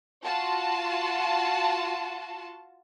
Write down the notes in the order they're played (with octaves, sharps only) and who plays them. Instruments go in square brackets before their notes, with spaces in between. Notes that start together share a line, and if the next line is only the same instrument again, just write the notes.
[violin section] F4 F#4 A5